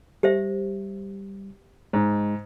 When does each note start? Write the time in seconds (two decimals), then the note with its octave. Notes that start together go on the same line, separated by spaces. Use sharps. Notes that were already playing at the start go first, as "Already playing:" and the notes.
0.23 G3 G4 C5 E5
1.93 G#2 G#3 D#4